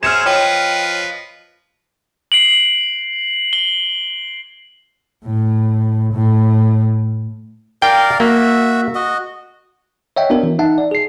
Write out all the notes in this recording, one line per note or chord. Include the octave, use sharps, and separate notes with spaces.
F#3 G#4 C5 F6 G#6 C#7 E7
F3 B4 C#5 D#5 G5
C7 D7 F#7
G7
A2
A2
A#4 D5 F5 G5
A#3 F#4 E5
F#4 D#5
C#5 D#5 E5 F#5 G5
B3 D4 F#4 A#4
E3
D#4 E5 F#5 A5
D5
G#4 C7